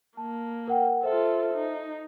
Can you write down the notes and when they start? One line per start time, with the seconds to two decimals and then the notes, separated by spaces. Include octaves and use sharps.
0.17 A#3 A5
0.68 A#4 F#5 G5
1.03 F4 A4 C5 E5
1.54 D#4